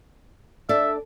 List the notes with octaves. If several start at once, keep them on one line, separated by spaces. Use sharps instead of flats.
D4 A4 D5 E5